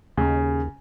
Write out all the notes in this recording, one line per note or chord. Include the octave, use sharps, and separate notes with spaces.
D#2 C#3